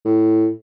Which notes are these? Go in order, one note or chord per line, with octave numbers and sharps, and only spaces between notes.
A2